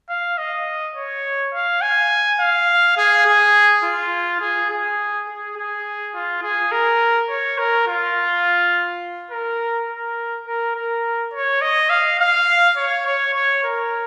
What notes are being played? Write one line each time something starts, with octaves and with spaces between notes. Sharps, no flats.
F5
D#5
C#5
F5
G#5
F5
G#4
G#4
F4
G#4
G#4
G#4
G#4
F4
G#4
A#4
C#5
A#4
F4
A#4
A#4
A#4
A#4
C#5
D#5
F5
F5
C#5
C#5
C#5
A#4